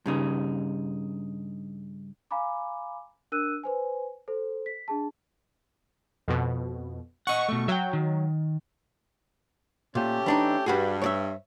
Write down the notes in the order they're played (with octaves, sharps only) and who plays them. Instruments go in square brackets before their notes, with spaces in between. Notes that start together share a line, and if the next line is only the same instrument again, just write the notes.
[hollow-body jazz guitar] G2 C#3 D#4
[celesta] F5 G#5 A#5 B5 D6
D4 A#4 E6 F#6 D#7
B4 C5 G#5
A4 C5
B6
D4 G#4 A5
[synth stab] F2 B2
[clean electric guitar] D#5 F#5 [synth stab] C#6
[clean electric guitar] B2 A3
[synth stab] F#3 [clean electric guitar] E5 G5
[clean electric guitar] D#3
[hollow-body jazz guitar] A#2 [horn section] A3 C#4 G4
[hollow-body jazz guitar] E3 D4 D#4
[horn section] G2 [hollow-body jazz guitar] G3 F#4 G#4
[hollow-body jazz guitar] C#5 D5 E5